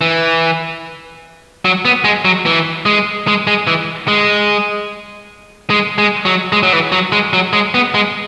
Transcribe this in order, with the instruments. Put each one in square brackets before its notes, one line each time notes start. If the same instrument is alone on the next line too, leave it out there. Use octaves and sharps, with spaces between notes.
[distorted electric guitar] E3
F#3
B3
G#3
F#3
E3
G#3
G#3
G#3
E3
G#3
G#3
G#3
F#3
G#3
F#3
E3
F#3
G#3
F#3
G#3
B3
G#3